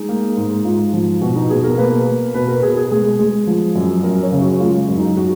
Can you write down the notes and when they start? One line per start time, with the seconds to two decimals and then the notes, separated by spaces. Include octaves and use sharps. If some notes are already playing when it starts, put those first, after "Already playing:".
Already playing: G#3 D#4
0.09 A#3
0.37 G#2
0.65 G#2 F4
0.93 F3
1.21 B2 F#4
1.36 D#4
1.50 B2 G#4
1.64 A#4
1.78 A#3 B4
2.06 A#3
2.34 B2 B4
2.48 A#4
2.62 B2 G#4
2.77 G#4
2.91 G#3 G#4
3.19 G#3
3.47 F3
3.76 F#2
4.03 F#2 A#4
4.23 C#5
4.32 C#3
4.41 F#4
4.60 G#3 F4
4.89 F#2
4.98 D#4
5.17 F#4